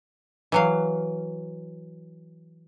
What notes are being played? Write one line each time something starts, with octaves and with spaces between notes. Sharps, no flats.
E3 F#3 F5